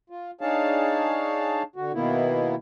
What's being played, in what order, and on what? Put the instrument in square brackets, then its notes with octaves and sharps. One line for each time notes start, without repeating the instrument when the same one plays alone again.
[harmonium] F4
D4 D#4 G#4 C#5 F5 A5
D3 F#4
B2 D#3 A#3 B3 E4